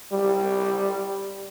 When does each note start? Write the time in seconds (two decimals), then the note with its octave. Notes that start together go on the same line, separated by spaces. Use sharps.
0.12 G3